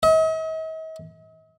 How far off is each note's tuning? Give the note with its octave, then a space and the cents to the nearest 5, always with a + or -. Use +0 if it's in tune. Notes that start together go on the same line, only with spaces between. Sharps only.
D#5 +45